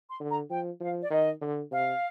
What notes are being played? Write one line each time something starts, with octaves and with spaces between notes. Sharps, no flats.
C6
D3
A#5
F3 G5
F3 F5
D5
D#3 D#5
D3
C3 F5